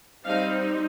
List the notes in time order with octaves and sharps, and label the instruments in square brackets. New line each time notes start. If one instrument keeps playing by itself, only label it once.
[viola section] G3 C4 D#4 F5